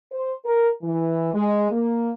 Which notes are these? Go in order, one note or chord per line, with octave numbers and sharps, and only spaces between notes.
C5
A#4
E3
G#3
A#3